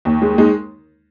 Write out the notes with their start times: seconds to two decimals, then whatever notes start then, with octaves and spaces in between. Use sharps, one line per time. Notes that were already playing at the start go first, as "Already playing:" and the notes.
0.05 D#2
0.22 G#3
0.38 G#3 D#4